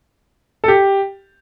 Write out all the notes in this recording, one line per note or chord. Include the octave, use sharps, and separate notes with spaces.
A4
G4